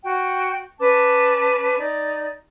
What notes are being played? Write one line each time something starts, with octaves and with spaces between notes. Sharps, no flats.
F#4 G5
C#4 B4 A5 D6
D#4 D5